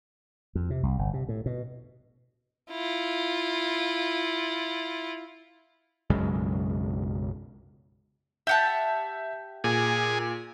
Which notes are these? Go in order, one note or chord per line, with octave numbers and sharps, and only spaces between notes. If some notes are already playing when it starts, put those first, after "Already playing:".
F2
C3
C2
G1
C3
A2
B2
E4 F4
B1 F#2 C#3 G#3
G4 E5 F#5 A5
A#2 G#4